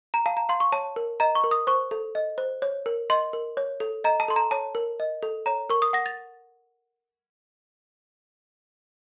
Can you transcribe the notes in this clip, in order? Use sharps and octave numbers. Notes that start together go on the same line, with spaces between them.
A#5
F5 A5
A#5
F5 C6
C#6
C#5 A5
A#4
D#5 A#5
C#6
A#4
D#6
C5 C#6
A4
D#5
C5
C#5
A#4
D#5 C6
A#4
C#5
A4
D#5 A#5
A5
A4 C6
A#5
C#5 A5
A#4
D#5
A4
C#5 A#5
A#4 C#6
D#6
F#5 A#6
A6